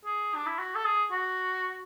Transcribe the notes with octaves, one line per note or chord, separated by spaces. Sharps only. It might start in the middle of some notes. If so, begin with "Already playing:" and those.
G#4
D4
E4
F#4
A4
G#4
F#4